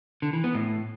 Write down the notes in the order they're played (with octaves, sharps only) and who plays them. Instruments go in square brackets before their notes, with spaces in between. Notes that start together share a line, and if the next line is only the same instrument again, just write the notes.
[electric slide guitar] D3
E3
B3
A2